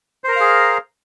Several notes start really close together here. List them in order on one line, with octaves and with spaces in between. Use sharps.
C5 A#4 A#5 F5 G#4